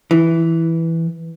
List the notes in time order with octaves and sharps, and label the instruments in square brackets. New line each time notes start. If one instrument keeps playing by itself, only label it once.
[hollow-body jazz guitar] E3